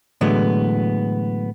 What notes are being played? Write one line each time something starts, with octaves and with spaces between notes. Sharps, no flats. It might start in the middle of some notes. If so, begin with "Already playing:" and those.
A2 D3 E3 F#3 G#3 B3